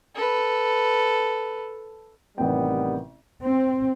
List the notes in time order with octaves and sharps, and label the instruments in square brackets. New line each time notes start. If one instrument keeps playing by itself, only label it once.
[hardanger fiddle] A4 B4
[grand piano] A1 C3 G5 [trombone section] D#3 G3 B3
[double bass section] C4